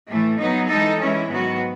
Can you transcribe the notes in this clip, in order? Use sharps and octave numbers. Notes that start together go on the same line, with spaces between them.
A2 E3 A3
F#3 B3 D#4
E3 G#3 D#4 A4
E3 G#3 C#4 E4
G#2 D#3 F#3 B3 F#4